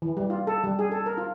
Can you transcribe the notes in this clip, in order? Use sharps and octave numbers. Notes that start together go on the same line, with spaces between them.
E3
G3
F4
A4
G3
G#4
A4
A#4
F4